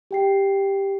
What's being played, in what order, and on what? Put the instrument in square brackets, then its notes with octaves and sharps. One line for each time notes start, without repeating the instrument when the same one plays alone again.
[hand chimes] G4 G5 C7